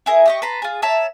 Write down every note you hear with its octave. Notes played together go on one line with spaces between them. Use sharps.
E4 G#4 A#4
G4 D#5 C#6
B4 A5 A#5 C6
F4 G#4
C#5 E5 A5 A#5